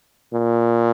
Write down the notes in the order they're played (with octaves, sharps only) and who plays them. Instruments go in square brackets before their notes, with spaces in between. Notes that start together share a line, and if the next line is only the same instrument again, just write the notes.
[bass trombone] A#2